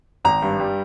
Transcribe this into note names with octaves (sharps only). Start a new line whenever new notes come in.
G#1 A#5
G2
G3